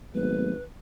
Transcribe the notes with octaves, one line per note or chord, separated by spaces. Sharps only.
G#1 F#3 A3 B3 B4